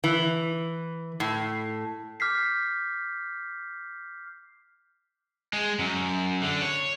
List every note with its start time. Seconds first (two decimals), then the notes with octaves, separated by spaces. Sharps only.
0.04 E3
1.20 A2
2.20 D6 F6 G6 B6 C7
5.53 G#3
5.79 F#2
6.43 D3
6.62 C#5